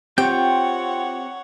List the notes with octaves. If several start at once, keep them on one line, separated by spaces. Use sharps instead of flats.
C4 F4 G4 C#5 F#5 G5 G6